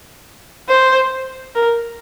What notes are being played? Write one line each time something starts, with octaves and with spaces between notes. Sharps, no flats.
C5
A#4